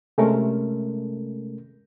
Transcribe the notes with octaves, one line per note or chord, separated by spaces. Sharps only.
C3 G#3 A3 C#4 A4 A#4